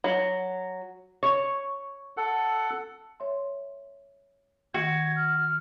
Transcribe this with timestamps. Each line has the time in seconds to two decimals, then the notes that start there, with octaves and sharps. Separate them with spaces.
0.04 F#3
1.23 C#5
2.17 A4 F#5
3.20 C#5 E5 C6
4.74 D#3 F#4 G#6
5.16 F6